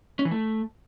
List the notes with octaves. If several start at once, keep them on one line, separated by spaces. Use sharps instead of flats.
C#4
E3
A3